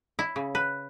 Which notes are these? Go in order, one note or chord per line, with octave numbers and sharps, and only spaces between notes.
E4
C#3
B4